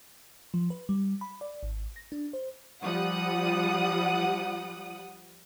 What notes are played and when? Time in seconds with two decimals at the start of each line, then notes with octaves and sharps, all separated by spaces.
0.54 F3
0.70 B4
0.89 G3
1.21 B5
1.41 D5
1.63 G#1
1.96 A#6
2.12 D4
2.33 C5
2.81 F3 G3 F#5 D#6